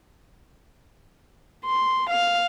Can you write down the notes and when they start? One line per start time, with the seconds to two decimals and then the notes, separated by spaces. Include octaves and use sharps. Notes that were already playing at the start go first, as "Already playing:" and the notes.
1.66 C6
2.10 F5